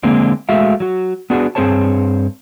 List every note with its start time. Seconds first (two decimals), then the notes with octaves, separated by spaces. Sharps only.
0.03 D3 G#3 A#3 C4 D4
0.49 G#3 A3 F#4 E5 F5
0.80 F#3 F#4
1.30 B3 D4 F#4 G#4
1.55 G2 C4 G#4 C5 C#5 A5